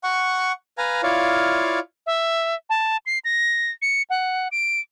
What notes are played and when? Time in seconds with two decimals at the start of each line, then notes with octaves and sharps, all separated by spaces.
0.03 F#5 C#6
0.78 B4 F5 G#5 A#5
1.03 E4 F4 C#5 D5 F5
2.06 E5
2.70 A5
3.06 C7
3.25 A#6
3.82 C#7
4.10 F#5
4.52 D7